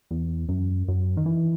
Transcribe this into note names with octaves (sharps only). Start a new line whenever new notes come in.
E2
F#2
F#2
D#3
E3